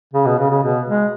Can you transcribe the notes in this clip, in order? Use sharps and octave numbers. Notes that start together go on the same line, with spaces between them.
C#3
B2
C#3
C#3
B2
G#3